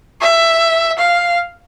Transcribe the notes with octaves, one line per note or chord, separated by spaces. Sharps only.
E5
F5